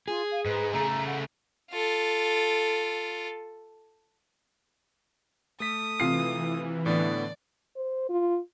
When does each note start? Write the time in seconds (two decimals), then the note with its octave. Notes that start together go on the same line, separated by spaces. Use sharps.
0.08 F4 G#4
0.31 F5
0.46 G#2 B4
0.73 C#3 A3 A#5
1.06 F#5
1.71 F4 A4
5.60 A3 A4 D#6 B6
6.00 C3 E3 F4 C7
6.86 A2 D3 B3 D5
7.76 C5
8.09 F4